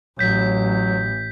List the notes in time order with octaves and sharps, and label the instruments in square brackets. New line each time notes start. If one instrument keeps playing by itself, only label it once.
[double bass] A1 [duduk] F#3 [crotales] G6 B6